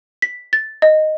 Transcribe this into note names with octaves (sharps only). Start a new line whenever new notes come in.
B6
A6
D#5